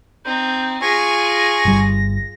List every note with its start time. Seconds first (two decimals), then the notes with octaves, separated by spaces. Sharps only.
0.25 C4 D#4 G6
0.82 F4 G#4 G#5 C#6 A#6
1.65 G1 G3